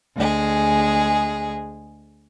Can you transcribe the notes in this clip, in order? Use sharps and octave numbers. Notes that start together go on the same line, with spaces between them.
D2 G#3 G#4